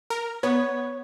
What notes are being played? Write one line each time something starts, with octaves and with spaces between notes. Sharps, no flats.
A#4
B3 C#5